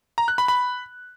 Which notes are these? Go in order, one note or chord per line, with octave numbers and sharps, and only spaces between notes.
A#5
F#6
B5
B5